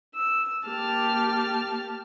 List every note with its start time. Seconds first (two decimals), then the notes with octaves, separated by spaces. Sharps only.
0.16 E6
0.68 A#3 G4 A5 F6